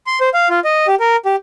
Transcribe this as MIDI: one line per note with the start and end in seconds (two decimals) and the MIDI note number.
0.07 0.19 84
0.21 0.29 72
0.34 0.48 77
0.49 0.60 65
0.64 0.87 75
0.87 0.95 67
1.00 1.16 70
1.26 1.36 67